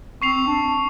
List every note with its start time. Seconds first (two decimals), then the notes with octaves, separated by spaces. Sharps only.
0.22 C4 C#6 C7 F7
0.47 D4